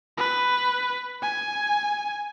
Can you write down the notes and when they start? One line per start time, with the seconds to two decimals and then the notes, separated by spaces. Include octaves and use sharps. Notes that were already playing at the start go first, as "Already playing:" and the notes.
0.18 B4
1.22 G#5